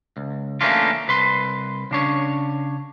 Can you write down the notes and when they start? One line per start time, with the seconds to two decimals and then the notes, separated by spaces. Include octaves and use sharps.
0.17 C#2
0.61 E3 A3 A#3 C#4 D4 F4
1.08 C2 B4 C6
1.91 C#3 D4 C#5